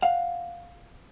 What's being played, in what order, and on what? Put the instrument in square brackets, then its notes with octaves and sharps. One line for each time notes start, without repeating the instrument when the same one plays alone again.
[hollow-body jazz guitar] F5 F#5